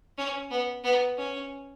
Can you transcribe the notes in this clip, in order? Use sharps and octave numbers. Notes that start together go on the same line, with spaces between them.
C#4
B3
B3
C#4